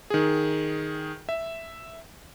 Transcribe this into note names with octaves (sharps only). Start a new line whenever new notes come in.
D#3 G#4
E5